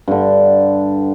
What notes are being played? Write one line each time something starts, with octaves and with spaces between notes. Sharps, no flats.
G2 D3